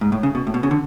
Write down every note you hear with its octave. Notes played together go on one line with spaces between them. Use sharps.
G#2
A2
C#3
B2
A2
B2
C#3
D3